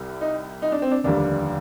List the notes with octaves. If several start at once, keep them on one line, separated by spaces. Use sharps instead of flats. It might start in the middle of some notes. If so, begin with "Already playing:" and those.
Already playing: C2 C3 G3
D#4
D#4
D4
C4
D4
F1 D#2 D3 G3 D4